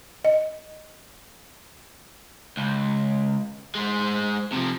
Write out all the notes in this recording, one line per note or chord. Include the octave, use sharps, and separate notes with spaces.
D#5
C#2
G#3 C5
C3 F3